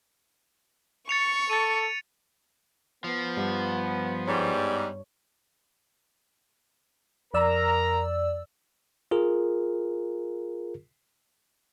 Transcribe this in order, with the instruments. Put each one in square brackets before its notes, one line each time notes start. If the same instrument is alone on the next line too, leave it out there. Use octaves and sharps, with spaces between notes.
[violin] C#6 [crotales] A6 C#7 F7
[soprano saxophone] A4 [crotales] A6 D#7
[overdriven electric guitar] F3 [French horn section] B3
[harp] G2
[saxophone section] G#2 G3 [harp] C#5
[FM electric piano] F2 D5 E6 [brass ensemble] A#4 A#5
[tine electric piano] F4 G#4 A#4